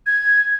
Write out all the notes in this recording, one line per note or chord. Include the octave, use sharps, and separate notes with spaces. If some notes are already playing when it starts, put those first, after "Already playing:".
G#6